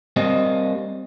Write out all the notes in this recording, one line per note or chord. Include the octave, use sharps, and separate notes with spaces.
G3 A#3 C4 D#5